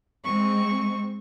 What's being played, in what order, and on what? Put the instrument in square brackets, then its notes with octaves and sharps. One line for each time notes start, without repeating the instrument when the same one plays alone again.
[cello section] G#3 C4 [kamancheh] C#6